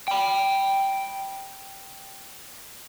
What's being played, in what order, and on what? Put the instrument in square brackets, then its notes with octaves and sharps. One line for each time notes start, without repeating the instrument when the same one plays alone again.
[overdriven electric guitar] G5 B5